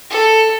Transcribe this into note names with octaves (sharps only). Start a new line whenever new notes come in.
A4